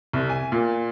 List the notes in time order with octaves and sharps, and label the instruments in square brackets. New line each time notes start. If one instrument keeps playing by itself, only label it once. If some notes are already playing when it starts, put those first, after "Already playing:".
[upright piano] C2
G#5
A#2